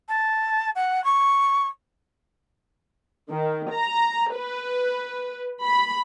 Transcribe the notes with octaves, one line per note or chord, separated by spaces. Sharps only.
A5
F#5
C#6
D#3
A#5
B4
B5